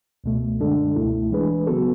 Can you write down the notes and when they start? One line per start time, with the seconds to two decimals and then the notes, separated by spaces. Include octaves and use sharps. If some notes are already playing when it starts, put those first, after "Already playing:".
0.24 C#2 B2 A3
0.60 F#2 D3 G#3 D4 A4
0.96 C#2 B2 A3 E4
1.31 E3 G#3 D4 G#4 B4
1.67 C#3 F#3 B3 F#4 A4